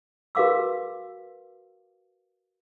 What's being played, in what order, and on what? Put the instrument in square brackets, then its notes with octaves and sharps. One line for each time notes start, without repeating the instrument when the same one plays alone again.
[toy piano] F#4 A#4 B4 F5 D6 E6